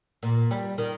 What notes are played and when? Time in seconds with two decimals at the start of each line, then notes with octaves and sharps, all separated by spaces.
0.23 A#2
0.51 G3
0.78 D#3